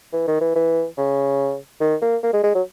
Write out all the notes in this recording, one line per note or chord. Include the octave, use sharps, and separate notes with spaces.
E3
D#3
E3
E3
C#3
D#3
A#3
A#3
G#3
G#3
F#3